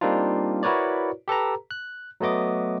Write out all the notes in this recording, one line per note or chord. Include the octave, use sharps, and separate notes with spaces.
G3 A#3 C4 D4 D#4 F4
E4 F#4 A#4 B4 C#5 D5
G4 A4 B4 A#5
F#6
F#3 A3 B3 D#5 D6